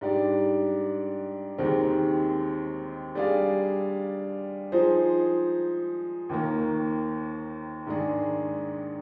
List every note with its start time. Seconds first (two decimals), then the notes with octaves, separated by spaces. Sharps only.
0.01 G#2 G3 D4 G4 D5
1.58 D#2 D#3 G#3 C4 G4
3.15 G3 D4 G#4 D5 F5
4.72 F3 G#3 D#4 G#4 C5
6.29 D#2 D#3 A#3
7.86 G#2 D#3 G#3 D4 G#4